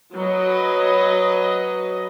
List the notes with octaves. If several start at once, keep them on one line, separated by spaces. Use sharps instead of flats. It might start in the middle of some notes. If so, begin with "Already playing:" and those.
F#3 B4 D#5